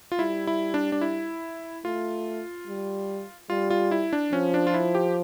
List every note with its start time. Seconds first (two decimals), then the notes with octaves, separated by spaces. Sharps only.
0.12 F4
0.19 G3 E4
0.47 E4
0.74 D4
0.92 D4
1.01 E4
1.84 A3 F4
2.67 G3
3.50 G3 F4
3.70 F4
3.91 E4
4.13 D4
4.32 F3 C#4
4.54 D4
4.67 F4
4.74 E4
4.95 G4